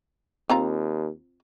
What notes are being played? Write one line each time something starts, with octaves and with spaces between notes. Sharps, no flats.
D#2 C4 F4 A#5